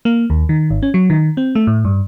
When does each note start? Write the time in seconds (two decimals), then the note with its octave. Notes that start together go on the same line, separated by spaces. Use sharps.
0.05 A#3
0.30 D#2
0.49 D#3
0.70 G#1
0.83 C#4
0.94 F#3
1.10 D#3
1.37 C4
1.55 A3
1.67 A2
1.85 G2